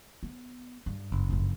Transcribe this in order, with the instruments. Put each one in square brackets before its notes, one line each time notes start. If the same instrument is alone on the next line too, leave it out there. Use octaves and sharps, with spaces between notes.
[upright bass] B3
G2
[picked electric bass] F#1
[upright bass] G1 F2